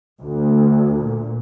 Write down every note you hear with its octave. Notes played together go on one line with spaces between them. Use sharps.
D2
A#2